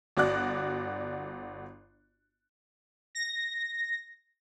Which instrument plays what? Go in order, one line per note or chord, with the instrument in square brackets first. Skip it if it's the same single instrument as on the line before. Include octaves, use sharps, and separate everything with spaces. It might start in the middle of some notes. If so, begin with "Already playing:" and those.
[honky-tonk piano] G1 F#4 D5 F#6
[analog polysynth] A#6